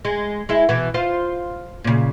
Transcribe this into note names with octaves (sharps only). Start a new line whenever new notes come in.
G#3
G#3 E4
B2 E3
F4 C5 F5
A#2 C#3